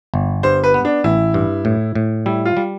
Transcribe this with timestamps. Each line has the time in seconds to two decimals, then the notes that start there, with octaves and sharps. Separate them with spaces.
0.14 G1
0.43 G2 C5
0.64 B4
0.74 B3
0.85 D4
1.04 A1 E4
1.34 G2
1.65 A2
1.95 A2
2.26 G3 E4
2.45 F4
2.57 G3